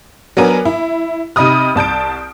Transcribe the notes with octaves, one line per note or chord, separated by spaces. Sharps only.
F#3 B3 D4 A#4 G#5
E4
C3 D#4 D#5 B5 D#6 F6
C2 A5 G6 D7